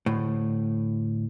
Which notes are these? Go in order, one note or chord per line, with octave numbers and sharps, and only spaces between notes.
D2 A2